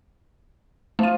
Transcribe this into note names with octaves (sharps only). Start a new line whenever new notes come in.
F3 A3 F4 D#7